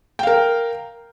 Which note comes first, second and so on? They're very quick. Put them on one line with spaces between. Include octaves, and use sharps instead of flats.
G5 F5 A#4